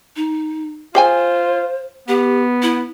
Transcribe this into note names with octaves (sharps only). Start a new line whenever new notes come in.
D#4
F4 G#4 C5 G5 G#5
B3 G4
E4